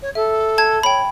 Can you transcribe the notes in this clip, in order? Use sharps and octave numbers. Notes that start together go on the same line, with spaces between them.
C#5
A4 E5
A5 G#6
C#5 G5 B5